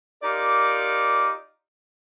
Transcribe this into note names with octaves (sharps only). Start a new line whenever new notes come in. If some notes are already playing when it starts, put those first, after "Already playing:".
D#4 F4 G4 A#4 D5